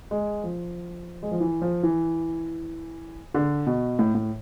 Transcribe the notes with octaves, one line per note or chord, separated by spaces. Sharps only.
G#3
F3
G#3
F3
E3
F3
E3
D3
B2
A2
A2